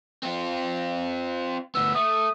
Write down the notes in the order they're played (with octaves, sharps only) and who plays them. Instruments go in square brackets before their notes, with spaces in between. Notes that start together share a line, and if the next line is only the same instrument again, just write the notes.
[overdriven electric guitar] C4 F4
[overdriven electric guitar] D2 B3 [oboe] E6
[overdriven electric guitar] A3 [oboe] D#6